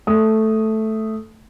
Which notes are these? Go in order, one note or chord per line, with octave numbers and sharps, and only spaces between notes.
A3 D#6